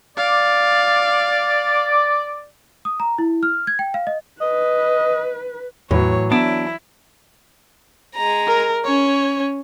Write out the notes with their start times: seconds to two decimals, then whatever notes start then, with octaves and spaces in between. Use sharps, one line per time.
0.17 D5 F5
2.85 D#6
3.00 A#5
3.18 E4
3.43 F6
3.67 G#6
3.79 G5
3.94 F5
4.07 D#5
4.41 B4 D#5
5.91 E2 A2 E3 F#3 C#5
6.32 B3 D4 E4
8.15 G#3 A#5
8.47 A#4
8.85 C#4 C#5